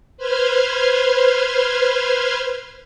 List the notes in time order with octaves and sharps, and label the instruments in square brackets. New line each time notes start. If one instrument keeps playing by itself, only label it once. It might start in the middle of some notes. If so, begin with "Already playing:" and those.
[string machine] B4 C5 C6 F6 G#6